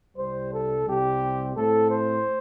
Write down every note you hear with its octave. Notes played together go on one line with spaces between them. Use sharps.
C2 C3 G3 C5
A4
C2 C3 G3 C4 G4
A2 A3 C4 A4
C5